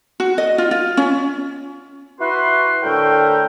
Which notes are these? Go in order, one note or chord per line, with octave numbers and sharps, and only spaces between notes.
F#4
D#5
F4
F4
C#4
E4 F#4 B4 C6
A2 D3 A3 A#4 G5